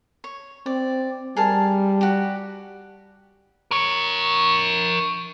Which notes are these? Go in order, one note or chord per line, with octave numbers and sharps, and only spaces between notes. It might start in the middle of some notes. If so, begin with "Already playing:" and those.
C#5
C4 D5
G3 G#4 A#4 A5
F#4 G4
A#4 C#5